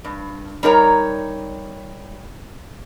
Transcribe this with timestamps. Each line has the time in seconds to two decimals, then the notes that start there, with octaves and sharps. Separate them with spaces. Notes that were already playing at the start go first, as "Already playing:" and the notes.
0.05 G2
0.63 G3 D#4 A#4 C#5